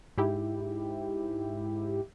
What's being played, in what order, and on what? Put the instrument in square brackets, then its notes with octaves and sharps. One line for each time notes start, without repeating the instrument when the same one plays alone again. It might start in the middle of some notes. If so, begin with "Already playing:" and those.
[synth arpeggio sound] G#2 E4 G4